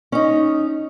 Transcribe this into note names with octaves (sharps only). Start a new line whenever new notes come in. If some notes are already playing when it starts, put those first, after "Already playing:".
C#4 D#4